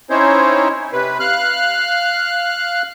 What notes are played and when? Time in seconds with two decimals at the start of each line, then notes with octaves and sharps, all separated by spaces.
0.10 C4 C#4 D#4 E4 C5 C#5
0.93 C3 B4
1.20 F5 F6 F#6